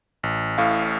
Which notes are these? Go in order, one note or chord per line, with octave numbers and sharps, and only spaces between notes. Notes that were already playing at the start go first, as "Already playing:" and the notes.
A1
A2 F5